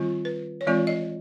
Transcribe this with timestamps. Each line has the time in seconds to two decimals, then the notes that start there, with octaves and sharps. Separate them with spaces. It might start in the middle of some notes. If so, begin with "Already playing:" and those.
Already playing: D#3 G3 C4 F4
0.25 B4
0.61 C#5
0.67 E3 G#3 C4 F4 D5
0.87 D#5